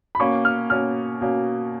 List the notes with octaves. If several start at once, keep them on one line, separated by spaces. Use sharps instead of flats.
B5
B2 A#3 C#4 C#6
F6
B2 A#3 C#4 F6
B2 A#3 C#4